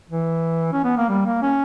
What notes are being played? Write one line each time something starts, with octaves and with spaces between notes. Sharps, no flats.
E3
C#4
B3
A#3
G3
A#3
C#4